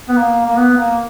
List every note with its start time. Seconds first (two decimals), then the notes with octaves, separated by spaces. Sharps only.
0.09 B3
0.16 A#3
0.46 A#3
0.57 B3
0.78 A#3